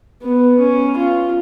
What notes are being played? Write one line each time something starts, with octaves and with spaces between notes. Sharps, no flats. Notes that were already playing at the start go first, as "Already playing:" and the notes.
B3
C#4
F4